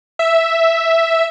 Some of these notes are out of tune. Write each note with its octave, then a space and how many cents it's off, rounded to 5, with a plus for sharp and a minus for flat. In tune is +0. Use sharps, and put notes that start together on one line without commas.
E5 +0